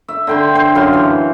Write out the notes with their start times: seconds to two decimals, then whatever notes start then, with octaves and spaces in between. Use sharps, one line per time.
0.08 E5
0.27 D3 G5 C6
0.55 C5
0.75 F#2 F5 F#5 C6
0.93 E3